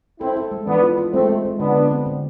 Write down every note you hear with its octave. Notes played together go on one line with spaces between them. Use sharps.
C4 E4 A4
A4
G#3
E3 B3 D4
F4
F4
G#3 A3 C4
C4
G#3
D3 B3 D4
D3
C4
D3